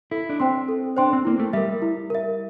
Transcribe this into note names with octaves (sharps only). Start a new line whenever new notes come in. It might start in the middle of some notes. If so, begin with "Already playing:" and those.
E4 A4
D4
C4 C5 G5 C6
A4
D4 C5 G5 C6
C4
A#3 E4
A3
G3 A#4 E5
E4
A#4 E5